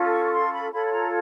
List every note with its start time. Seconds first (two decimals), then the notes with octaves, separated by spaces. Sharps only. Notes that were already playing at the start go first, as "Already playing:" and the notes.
Already playing: C#4 F4 A4
0.12 C#6
0.26 C#6
0.32 C6
0.52 B5
0.72 F4 A4 C#5 B5
0.87 B5
0.92 A#5